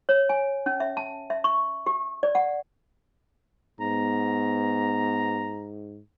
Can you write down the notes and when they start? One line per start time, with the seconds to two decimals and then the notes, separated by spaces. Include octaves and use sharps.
0.09 C#5
0.29 G#5
0.66 C#4
0.80 E5
0.97 A5
1.30 E5
1.44 C#6
1.86 G4
2.23 D5
2.35 F#5
3.80 G#2 B3 A#5